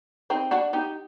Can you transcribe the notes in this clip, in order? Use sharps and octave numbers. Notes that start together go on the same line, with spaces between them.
C4 D#4
D4 F#4
D#4 G4